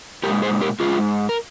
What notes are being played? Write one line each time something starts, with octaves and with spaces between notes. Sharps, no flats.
A#2 F3 G#3 G4 A#4
G#4 C5
G4 A#4
G#2 D#3 G#3 F4 G#4
A#4